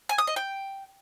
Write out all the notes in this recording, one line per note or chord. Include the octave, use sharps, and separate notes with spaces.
G#5
D#6
D#5
G5